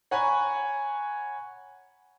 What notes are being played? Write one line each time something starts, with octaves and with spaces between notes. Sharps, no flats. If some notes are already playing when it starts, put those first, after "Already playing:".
C#5 F#5 G#5 A#5 B5